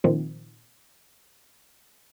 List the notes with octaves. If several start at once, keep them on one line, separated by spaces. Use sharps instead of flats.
A#2 D#3 F3 C4